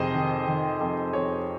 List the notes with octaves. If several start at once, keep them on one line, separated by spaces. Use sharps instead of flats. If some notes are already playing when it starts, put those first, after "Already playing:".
Already playing: F2 C3 D#3 G#4 C5 D#5
D#3
D#3
F2
F2 C#5